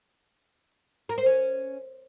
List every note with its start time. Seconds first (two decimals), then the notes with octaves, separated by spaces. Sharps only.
1.09 A#4
1.18 C5
1.26 C#4